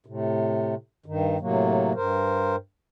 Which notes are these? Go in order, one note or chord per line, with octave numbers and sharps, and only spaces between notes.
A2 C3
G2 D#3
A2 C3 F#3 A#3
G2 A#4 C5